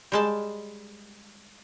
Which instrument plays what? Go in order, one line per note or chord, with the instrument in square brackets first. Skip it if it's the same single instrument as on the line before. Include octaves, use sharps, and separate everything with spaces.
[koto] G3 G#3 A5